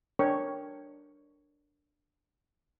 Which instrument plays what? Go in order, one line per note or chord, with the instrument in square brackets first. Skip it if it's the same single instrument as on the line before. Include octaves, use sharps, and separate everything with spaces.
[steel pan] D4 A#4 C#5 G5 C#6